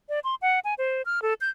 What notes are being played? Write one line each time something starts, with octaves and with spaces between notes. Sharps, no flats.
D5
C6
F#5
G#5
C5
F6
A4
G6